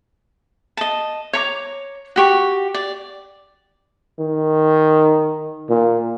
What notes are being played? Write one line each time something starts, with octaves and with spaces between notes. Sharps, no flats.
D#5 A5
C#5 A#5 D6
F#4 G4 C#6
D5
D#3
A#2